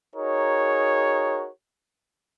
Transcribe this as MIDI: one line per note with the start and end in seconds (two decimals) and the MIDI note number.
0.16 1.50 63
0.16 1.50 66
0.16 1.50 68
0.16 1.50 70
0.16 1.50 73